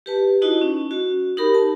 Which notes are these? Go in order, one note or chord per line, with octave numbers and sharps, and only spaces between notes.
G4 B4 A5
D#4 E4 F#4 D#5
C#4
F#4
D#4 G4 A#4 B5
A5